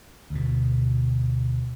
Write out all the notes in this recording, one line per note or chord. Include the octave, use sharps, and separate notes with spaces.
D2 B2